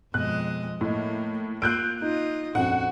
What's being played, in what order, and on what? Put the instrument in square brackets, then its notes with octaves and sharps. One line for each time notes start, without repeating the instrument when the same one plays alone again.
[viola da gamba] F2 G#3 D#5 [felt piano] B2 [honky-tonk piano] F#6
[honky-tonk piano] A2 [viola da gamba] A#3 [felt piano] E4 D#5
[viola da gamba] A#3 F4 [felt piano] E6 [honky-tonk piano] F#6 G6 D7
[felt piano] D#4 [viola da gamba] F4 D#5
[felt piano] A#1 F2 C#4 [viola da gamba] F#4 [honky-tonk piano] F#5